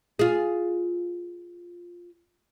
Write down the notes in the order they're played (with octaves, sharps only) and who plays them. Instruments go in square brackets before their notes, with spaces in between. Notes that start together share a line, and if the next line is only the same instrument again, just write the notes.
[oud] F4 G#4